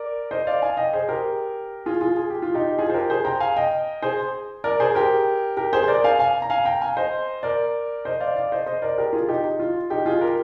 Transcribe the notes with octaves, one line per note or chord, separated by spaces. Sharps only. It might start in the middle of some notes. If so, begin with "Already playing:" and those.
Already playing: A#4 D5
C5 D#5
D5 F5
F5 G#5
D#5 G5
G#4 C5
G4 A#4
F4 G#4
F4 G#4
G#4
G4
F4
D#4 G4
F4 G#4
C5
G4 A#4
G#4 C5
G5 A#5
F5 G#5
D#5 G5
G#4 C5
A#4 D5
G#4 C5
G4 A#4
G4 A#4
G#4 C5
C5
A#4 D5
F5 G#5
F5 G#5
A#5
F5 G#5
G5 A#5
F5 G#5
C5 D#5
A#4 D5
C5 D#5
D5 F5
D5 F5
C5 D#5
C5 D#5
A#4 D5
G4 A#4
F4 G#4
D#4 G4
D#4
F4
D#4 G4
F4 G#4
G4 A#4